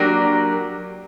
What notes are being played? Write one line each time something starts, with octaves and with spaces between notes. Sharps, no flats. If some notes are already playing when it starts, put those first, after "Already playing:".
Already playing: F#3 A#3 D4 G4 A#4